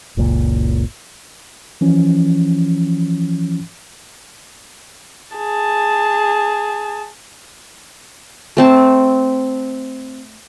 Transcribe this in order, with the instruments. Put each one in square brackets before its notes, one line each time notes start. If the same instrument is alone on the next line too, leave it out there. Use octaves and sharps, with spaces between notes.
[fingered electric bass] F#1 C#2 A#2
[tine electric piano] E3 F3 C#4
[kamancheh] G#4 A5
[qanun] A3 C4 A5